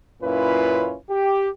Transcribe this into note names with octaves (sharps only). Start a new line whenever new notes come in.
F#2 A#2 C#4 E4 F4 B4
G4